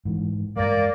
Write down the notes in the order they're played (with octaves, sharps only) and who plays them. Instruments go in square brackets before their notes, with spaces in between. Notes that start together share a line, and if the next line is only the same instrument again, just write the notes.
[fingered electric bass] G#2 E3
[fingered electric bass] G2 G#3 [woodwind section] A#3 D5